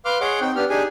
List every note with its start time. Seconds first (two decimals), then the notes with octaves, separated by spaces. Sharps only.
0.05 B4 F5 C6 D6 F6
0.20 G#4 C#5 D#5 F#5 C6 D6
0.41 C4 D#4 G5
0.56 B3 D4 G4 F6
0.70 D4 D#4 G4 G#4 G#5